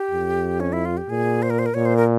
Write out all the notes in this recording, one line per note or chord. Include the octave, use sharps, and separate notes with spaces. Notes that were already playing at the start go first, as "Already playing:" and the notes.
Already playing: G4
F2
C#4
E4
F4
G4
A#2 G#4
C5
A#4
C5
A#4
A#2 C#5
C5
A#4